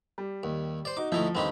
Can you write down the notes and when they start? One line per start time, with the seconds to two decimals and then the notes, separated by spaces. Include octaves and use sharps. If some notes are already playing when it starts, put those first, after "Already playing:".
0.18 G3
0.43 D#2
0.85 C5 D5
0.97 D#4 F#4 D6
1.12 D2 F3 D#4 E4
1.35 G1 D#2 C4 D#4 G4 B5